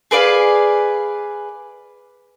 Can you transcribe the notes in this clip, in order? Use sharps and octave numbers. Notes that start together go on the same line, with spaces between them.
G#4 B4 D5 F5